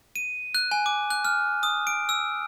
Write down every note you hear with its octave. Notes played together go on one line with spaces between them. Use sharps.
D#7
F#6
G#5
D6
F#6
F6
D#6
D7
E6